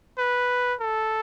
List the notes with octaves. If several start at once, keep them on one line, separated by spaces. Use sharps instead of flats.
B4
A4